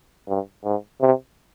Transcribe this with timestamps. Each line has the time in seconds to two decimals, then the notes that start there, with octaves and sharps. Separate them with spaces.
0.28 G2
0.64 G#2
1.01 C3